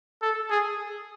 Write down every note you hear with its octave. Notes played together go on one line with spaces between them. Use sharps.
A4
G#4